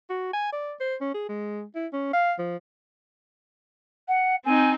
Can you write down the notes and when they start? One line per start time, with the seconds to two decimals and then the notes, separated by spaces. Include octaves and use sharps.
0.09 F#4
0.33 G#5
0.52 D5
0.80 C5
1.01 C#4
1.14 G#4
1.29 G#3
1.75 E4
1.93 C#4
2.13 F5
2.39 F3
4.08 F#5
4.45 C4 D#4 G#5